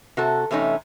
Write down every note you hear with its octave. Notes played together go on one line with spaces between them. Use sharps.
C3 F#4 A4
E2 C3 A3 C#4 D#4